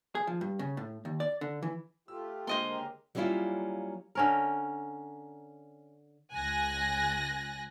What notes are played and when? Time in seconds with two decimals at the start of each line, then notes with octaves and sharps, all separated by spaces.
0.15 G#4
0.27 F3
0.41 G2
0.59 C#3
0.77 A2
1.05 D#2
1.20 D5
1.41 D3
1.62 E3
2.08 A3 F4 G4 E6
2.47 D3 G#3 A#3 C5 D#5 C6
2.69 C#3 G4 A#4
3.15 F#3 G3 A#3 C#4 E4 F4
4.15 D3 C#4 A#4
6.33 C#2 G#5 F#6 A#6